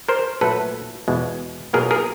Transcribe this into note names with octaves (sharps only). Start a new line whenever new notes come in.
A#4 C5
A#2 F#3 A3 A4 B4
E2 B2 G#3
B2 F#3 A#3 G#4 A#4
G#4 A#4